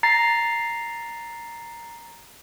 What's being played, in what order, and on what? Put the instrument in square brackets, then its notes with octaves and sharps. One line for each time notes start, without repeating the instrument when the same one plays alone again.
[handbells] A#5 A6 C7